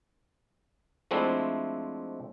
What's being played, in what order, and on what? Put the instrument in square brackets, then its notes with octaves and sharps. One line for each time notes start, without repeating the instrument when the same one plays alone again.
[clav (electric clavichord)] F3 G#3 A3 C4 D4 E4